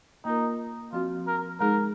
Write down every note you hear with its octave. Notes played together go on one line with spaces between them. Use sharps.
A#3 D#4 F4 A#4
F3 C4 F4 F#4
A#4
G#3 D#4 G#4 A#4